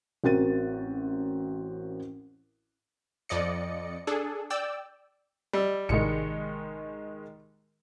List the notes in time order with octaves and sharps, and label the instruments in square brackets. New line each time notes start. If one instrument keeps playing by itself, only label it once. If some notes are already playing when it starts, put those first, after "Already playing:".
[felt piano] A1 C4 F#4 A#4 A6 D#7
[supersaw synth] F2 D5 D#5 C#7
D4 G#4 A4
D5 G5 E6
[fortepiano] G3 [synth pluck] D#5 E6
[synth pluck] A1 A2 C3 [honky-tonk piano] D#3 G#3 C#7